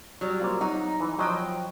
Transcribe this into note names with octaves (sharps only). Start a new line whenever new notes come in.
F#3 G3
A#3 C4 F4
F#3 D#4 F#4
E3
F3 F#3 C5 D#5 G5